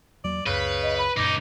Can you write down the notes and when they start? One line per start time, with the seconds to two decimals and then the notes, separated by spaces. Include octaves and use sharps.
0.24 E2 F#3 A#3 D5
0.46 C#2 F#2 C#3 B4
0.82 D#5
0.98 B5
1.17 C#2 F#2 A#2 D#4 D6